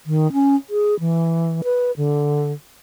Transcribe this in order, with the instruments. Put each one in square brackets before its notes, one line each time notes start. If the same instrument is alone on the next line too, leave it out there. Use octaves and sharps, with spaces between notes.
[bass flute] D#3
C#4
G#4
E3
B4
D3